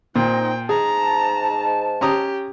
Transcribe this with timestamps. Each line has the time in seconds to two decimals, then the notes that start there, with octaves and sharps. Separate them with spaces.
0.16 A#2 C4 D#4 G5
0.69 G#2 G#4 A5 A#5
2.01 C#4 G4 A#5 D#6